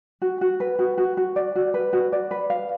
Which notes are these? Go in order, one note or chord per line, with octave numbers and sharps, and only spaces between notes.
F#4
F#4
B4
F#4
F#4
F#4
D5
F#4
B4
F#4
D5
B4
F5